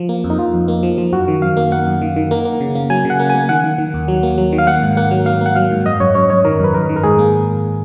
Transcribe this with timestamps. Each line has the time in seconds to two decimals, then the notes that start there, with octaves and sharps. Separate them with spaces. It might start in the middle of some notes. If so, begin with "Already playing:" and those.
Already playing: F3
0.09 A#3
0.24 F2
0.30 D#4
0.38 F2 F4
0.54 F2
0.68 A#3
0.83 F3
0.98 F3
1.12 F#2 F#4
1.28 D#3
1.42 F#2 F5
1.57 A#3
1.71 A#3 F#5
1.86 F#2
2.02 D#3
2.16 D#3
2.31 A#3
2.45 A#3
2.60 C#3
2.75 A#3
2.90 F#3 G#5
3.05 C#3
3.10 F#5
3.19 A#3
3.30 G#5
3.35 A#3
3.49 D#3 F#5
3.64 D#3
3.78 D#3
3.94 D#2
4.08 F#3
4.23 A#3
4.38 F#3
4.52 D#3
4.58 F5
4.67 A#3 F#5
4.82 G#2
4.97 A#3 F#5
5.11 F#3
5.26 A#3 F5
5.41 A#3 F#5
5.56 F#3 F5
5.71 G#2
5.86 F#2 D#5
6.00 F#2 C#5
6.15 F#2 C#5
6.30 F#2 C#5
6.45 D#3 A#4
6.60 F#2 B4
6.74 F#2 A#4
6.89 D#3
6.96 A#4
7.04 G#2 G#4
7.19 A#3